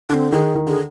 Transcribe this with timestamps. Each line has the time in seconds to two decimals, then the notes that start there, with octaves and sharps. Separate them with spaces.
0.09 D3 D4
0.14 C4
0.32 D#3 G#4
0.55 D#3
0.67 D3 G#4